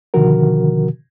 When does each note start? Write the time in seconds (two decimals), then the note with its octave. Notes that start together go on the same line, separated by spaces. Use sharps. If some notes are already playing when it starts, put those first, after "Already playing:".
0.14 B2 D3 D#3 F3 F#4 A#4